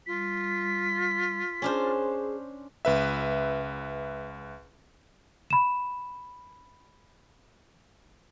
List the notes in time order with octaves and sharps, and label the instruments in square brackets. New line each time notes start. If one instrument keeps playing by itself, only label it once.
[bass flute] G3 [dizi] F4 [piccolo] B6
[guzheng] C#4 D4 C5 [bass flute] G#4
[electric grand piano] C#2 B4 E5
[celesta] B5 E7